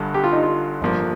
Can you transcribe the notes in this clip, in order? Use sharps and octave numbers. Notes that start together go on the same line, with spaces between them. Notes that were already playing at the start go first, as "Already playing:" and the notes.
Already playing: G1 G2 D3
G4
F4
D#4
F4
G1 G2 F3 A#3